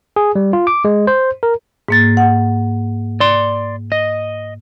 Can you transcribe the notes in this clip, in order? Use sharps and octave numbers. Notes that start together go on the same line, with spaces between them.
G#4
G3
F4
D6
G#3
C5
A#4
G#2 A#3 A6
F#5
D5 C6
D#5